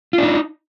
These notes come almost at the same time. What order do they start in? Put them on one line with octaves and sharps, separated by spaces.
F4 D4 D#4